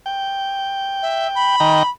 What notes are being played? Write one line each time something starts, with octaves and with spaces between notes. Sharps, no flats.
G5
E5
B5
D#3 G5 A#5